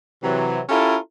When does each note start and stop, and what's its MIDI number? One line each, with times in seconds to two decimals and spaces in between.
0.23 0.60 48
0.23 0.60 52
0.23 0.60 54
0.69 0.97 61
0.69 0.97 64
0.69 0.97 65
0.69 0.97 67
0.69 0.97 69
0.69 0.97 70